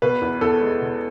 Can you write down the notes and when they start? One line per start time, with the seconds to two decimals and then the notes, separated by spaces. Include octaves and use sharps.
0.02 B2 B4
0.22 E2
0.41 E2 A4
0.61 G#3
0.81 B2